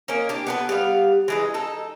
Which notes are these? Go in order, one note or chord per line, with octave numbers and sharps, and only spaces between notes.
A#3 C#4 D#4
D4 G4
B3 A4 B4
G3 B3 F5
E3 G#3 D#4
D#4 A4